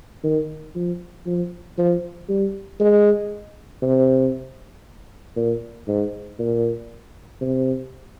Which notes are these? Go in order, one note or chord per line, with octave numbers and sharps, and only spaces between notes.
D#3
F3
F3
F3
G3
G#3
C3
A#2
G#2
A#2
C3